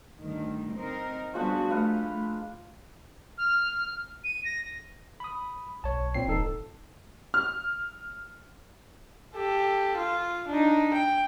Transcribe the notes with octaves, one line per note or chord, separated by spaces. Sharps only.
D2 G2 D#3
C4 D#4 A#4
F3 G3 G#3 B3 D4 F#4
A3 B4 F5 A#5
F6
D#7
A#6
B5 D#6
B1 C#5 A5
A#2 C4 C7
D#1 G#1 D#4 A4
F6
G4 A4
F4
D4 D#4
G5